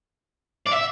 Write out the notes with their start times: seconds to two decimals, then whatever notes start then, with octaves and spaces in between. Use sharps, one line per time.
0.66 D5
0.71 E5